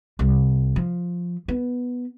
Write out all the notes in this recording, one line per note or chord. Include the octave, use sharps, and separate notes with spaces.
C2
F3
B3